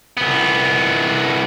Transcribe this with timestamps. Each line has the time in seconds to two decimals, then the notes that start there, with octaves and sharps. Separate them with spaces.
0.17 C2 B3